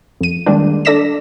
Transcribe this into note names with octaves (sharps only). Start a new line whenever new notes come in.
F2 D#7
D#3 G3 G#3 A#3 D4
D4 A4 D5 A#6 B6 E7